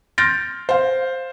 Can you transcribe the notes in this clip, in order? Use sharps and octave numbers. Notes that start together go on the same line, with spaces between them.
C6 F6 G6 A6 A#6 D7
C5 F5